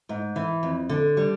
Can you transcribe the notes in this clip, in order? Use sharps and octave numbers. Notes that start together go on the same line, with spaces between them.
G#2
E3
F2
D3
G3